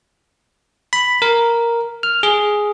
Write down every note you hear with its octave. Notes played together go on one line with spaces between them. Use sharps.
B5
A#4
F6
G#4